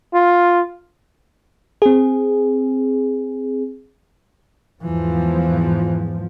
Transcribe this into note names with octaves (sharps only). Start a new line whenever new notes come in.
F4
C4 G#4
E2 G#2 E3 F3